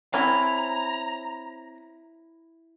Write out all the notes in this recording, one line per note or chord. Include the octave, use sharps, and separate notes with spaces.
C4 C#4 E4 A#5